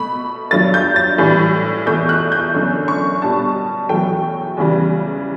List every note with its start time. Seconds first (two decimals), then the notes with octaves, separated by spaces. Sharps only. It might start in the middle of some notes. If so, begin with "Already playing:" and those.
Already playing: B2 A3 B5
0.51 G2 F#3 A3 A6
0.74 G6
0.96 A6
1.18 A2 E3 G3
1.86 E2 B2 A3 G6
2.09 F#6
2.32 G6
2.54 F#2 D3 A3
2.88 C#6
3.22 B2 G3 A5
3.89 E2 B2 F#3 A3 G5
4.57 E2 C#3 E3 G3